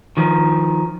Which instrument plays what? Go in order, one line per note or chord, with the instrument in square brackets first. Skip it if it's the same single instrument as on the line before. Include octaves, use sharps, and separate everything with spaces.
[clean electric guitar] D#3 F3